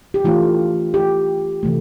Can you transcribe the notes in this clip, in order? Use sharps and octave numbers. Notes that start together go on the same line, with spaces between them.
G4
E3 A3 D4 F4
G4
C3 E3 A3